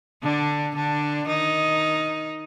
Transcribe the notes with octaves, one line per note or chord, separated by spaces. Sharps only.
D3 D4
D3 D4
D#3 D#4